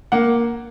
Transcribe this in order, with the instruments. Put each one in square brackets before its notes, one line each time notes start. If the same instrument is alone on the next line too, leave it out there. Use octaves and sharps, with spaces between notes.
[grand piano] A#3 F#5